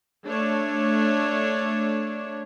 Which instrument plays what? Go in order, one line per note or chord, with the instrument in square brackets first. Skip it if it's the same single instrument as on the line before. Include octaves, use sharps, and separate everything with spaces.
[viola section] A3 D4 C#5